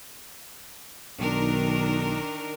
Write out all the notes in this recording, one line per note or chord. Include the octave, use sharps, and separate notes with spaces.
B1 D#3 D4 A#4